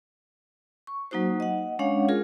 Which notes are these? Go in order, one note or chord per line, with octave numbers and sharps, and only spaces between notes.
C#6
F#3 A#3 D#4 F#4 C5
D#5 F#5
G#3 C#4 D4 C#5 F5 F#5
F4 G#4 A#4